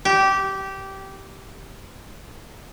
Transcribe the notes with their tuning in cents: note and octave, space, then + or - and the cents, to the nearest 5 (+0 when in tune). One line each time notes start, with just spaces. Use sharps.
G4 -15